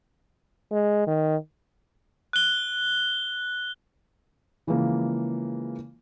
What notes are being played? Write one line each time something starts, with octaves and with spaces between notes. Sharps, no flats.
G#3
D#3
F#6 G7
C#3 E3 F3 G#3 A#3